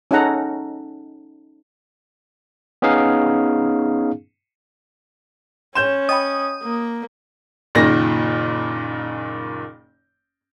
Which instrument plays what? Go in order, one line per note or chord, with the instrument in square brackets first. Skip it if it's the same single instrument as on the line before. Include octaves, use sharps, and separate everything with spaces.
[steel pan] C#4 D#4 G#4 A4 F#5 A#5
[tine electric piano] B3 C#4 D#4 G#4 F5
[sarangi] C#4 [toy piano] C#5 C6 [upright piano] G6 E7
[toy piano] D#5 G5 B5 [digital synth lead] D#6
[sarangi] A#3
[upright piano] F#1 A#2 D#3 A#6